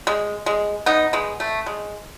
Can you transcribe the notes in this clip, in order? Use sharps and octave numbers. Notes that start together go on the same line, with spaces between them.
G#3
G#3
B3 D#4
G#3 B3
A3
G#3